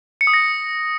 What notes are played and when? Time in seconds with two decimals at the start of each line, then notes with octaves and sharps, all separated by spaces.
0.21 C#7
0.27 D#6
0.34 A#6